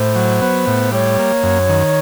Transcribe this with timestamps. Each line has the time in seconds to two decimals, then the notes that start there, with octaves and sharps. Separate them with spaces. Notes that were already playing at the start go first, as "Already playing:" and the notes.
Already playing: A2 C5
0.16 F#3
0.42 B3
0.67 A2
0.92 G3 C#5
1.19 A#3
1.43 F#2
1.69 D#3